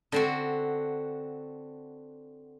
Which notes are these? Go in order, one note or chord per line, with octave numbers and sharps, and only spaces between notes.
D3 C4 F#4